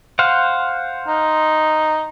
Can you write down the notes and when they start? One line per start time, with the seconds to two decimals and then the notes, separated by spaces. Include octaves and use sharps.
0.19 C5 F5 F#5
1.08 D#4